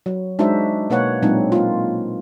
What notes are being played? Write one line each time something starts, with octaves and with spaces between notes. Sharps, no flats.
F#3
G#3 D4 D#4 F#4 C5 E5
B2 A#3 B4 C#5 F#5
A#2 F#3 G#3 C4 D4 D#4
A#3 F4